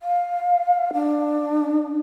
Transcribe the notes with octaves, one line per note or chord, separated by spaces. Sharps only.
F5
D4